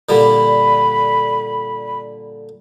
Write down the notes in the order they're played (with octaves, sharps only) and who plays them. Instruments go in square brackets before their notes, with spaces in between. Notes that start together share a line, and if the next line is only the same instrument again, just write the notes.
[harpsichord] A#2 D3 G3 [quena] B5